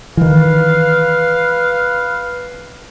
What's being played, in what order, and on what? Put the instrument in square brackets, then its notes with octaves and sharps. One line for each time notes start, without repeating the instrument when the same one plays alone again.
[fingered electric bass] D#3 E3 [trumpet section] B4 F5